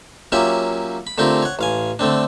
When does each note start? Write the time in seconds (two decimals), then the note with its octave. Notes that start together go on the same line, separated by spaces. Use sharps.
0.32 F#3 A#3 C#4 F4 G4 E5
1.07 B5
1.18 D3 A3 C4 F4 G4 A#4
1.42 C#5 F#5
1.59 A1 F5 G#5
1.99 D3 A3 C4 D4